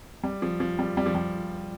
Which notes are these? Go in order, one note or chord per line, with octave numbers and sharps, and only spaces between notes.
G3
F3
F3
G3
G3
F3
G3